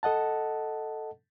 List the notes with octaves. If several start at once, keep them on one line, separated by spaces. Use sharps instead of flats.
A4 D#5 F#5 A5